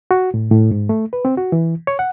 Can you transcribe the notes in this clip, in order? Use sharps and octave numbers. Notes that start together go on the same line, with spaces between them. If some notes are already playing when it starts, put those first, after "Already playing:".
F#4
A2
A2
G#2
A3
B4
C4
F#4
E3
C#5
F#5